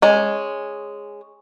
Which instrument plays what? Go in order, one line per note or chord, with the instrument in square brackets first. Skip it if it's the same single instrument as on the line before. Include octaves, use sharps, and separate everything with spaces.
[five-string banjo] G#3 C#4